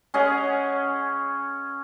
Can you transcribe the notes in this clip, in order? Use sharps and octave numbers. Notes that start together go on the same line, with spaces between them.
C#4 G#4 D#5 F#5